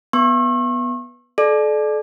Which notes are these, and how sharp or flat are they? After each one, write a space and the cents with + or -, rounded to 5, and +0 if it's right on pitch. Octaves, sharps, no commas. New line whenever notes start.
B3 -10 C#6 -40
A4 -35 D5 +20